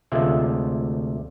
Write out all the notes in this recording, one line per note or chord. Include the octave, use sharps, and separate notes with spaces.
D2 C3 G#3 A3 F4 E5